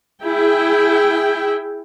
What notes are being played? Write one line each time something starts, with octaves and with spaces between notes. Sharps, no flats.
E4 G#4 G5